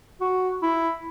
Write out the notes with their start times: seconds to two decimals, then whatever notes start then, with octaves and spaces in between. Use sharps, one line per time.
0.21 F#4
0.62 E4